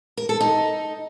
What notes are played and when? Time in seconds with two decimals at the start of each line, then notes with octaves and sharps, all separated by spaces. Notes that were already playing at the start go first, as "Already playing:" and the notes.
0.17 A#4
0.29 A4
0.41 D#4